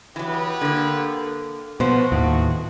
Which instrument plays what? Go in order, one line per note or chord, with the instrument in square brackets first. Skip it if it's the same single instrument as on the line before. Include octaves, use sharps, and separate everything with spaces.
[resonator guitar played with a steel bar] E3 F#3 [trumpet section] B3 G4 B4
[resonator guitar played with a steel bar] D3 A#3
[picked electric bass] B2 [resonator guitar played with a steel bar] F3 C5 [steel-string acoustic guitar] B3 [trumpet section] F#4
[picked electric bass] D#2 [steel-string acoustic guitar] A2